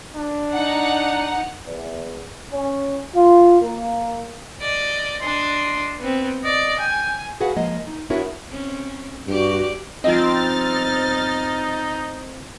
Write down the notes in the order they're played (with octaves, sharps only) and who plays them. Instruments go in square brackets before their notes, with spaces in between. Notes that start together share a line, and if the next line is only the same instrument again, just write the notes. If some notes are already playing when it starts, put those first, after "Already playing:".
[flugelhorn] D4
[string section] D#4 F#5
[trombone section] E2
C#4
F4
A#3
[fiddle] D5 D#5
[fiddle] D4 D#5 [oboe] C6
[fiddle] B3 C4
[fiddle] D5 [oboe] D#5
[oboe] G5 [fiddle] G#5
[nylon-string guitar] F#4 G#4 B4 F5 F#5
F3 G#3 A#3 D#5
D#4
B3 D4 E4 F#4 A#4 C#5
[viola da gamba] C4 C#4
[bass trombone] G2 [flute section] F#4 [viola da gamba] G4 D5
[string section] G1 F6 A6 [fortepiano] F3 D#5 [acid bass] C4 [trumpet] D#4